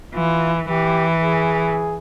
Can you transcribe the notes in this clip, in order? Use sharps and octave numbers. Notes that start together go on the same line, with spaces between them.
E3 F4
E3 G4
G#4